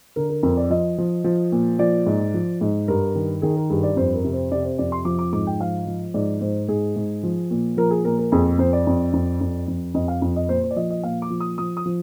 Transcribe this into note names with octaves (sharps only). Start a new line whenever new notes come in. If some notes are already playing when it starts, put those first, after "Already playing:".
D3 A#4
A#4
F2 A#4
D5
F3 D#5
F3
F3
A#2
F3 D5
G#2
F3
G#2
G2 A#4
D#3
D#3 G#4
A#4
G2 G#4
D5
F2 C5
A#4
C3
C5
C3 D5
C5
F2 D5
C6
F3 D6
D6
G#2 D6
G5
F3 F5
F3
G#2 D5
G#2 C5
G#2 G#4
G#2
F3
A#2
F3 A#4
G#4
A#2 A#4
A#4
F2 G#4
F2 C5
D5
F2
F2
F2
F2
F2 D#5
F5
F2
D#5
A#2 C5
C5
D5
F3 D#5
D#5
A#2 F5
D6
F3
D#6
F3 D#6
D#6
F3